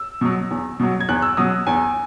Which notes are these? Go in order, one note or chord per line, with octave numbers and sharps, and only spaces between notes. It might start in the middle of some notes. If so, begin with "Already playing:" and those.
Already playing: E6
B2 F#3
E2
B2 F#3
G#6
E2 F#6
E6
B2 F#3 D#6
E2 G#5